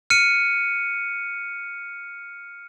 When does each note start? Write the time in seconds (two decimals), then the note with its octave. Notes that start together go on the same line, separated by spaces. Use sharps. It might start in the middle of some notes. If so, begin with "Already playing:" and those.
0.10 F6 C#7 D#7